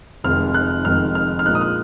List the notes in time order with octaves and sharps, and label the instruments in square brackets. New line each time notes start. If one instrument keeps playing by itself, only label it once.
[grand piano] F1 F2 D#3 G#3 F6
F#6
F1 F2 D#3 G#3 F6
F6
F6
A#1 A#2 G#3 D#4 F#6
D#6
F6